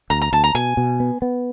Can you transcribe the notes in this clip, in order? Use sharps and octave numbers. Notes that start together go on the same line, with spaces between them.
D2 A#5
A#5
D2 A5
A#5
B2 G#5
B2
B3
B3